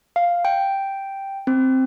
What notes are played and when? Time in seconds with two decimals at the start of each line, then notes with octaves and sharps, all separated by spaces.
0.16 F5
0.45 G5
1.47 C4